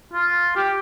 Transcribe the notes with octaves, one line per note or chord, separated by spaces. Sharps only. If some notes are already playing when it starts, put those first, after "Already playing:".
F4
G4